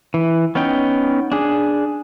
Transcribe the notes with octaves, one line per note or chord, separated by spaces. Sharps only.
E3
B3 C#4 D#4 G5
D4 G#4